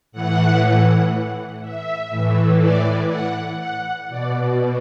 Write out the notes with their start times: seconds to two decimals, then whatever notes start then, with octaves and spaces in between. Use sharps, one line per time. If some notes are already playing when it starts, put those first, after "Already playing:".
0.12 A2 E3 F#5
1.61 E5
2.10 A2 E3
2.60 D5
3.09 F#5
3.59 F#5
4.09 B2 D5